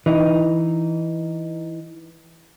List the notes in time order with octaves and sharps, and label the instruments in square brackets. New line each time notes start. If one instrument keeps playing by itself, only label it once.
[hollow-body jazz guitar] E3 D#4